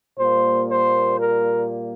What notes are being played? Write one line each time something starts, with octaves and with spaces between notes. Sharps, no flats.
A#2 G3 A#3 C5
C5
A#4